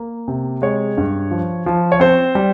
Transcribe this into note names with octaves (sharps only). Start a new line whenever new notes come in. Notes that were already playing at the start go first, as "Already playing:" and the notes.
Already playing: A#3
C3
G#3 C#5
G2
F3
F3
C#5
C4 C5
G3